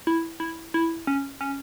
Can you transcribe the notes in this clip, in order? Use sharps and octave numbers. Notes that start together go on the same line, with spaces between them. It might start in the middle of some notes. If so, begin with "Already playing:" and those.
E4
E4
E4
C#4
C#4